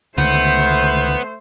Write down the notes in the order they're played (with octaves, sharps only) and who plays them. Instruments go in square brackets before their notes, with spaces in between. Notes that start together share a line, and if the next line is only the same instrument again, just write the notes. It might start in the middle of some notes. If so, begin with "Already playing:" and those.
[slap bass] C#2 D3 D#3 [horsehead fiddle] A3 C5 [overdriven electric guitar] B3 [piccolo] G6